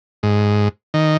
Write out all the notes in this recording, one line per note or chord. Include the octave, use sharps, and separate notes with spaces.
G#2
D#3